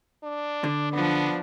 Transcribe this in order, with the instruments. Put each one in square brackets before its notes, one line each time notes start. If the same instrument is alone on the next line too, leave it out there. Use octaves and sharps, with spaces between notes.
[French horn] D4
[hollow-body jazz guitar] D3
[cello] F3 D4 [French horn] B3